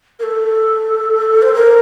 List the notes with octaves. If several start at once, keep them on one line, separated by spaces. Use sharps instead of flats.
A#4
A4
C5
A#4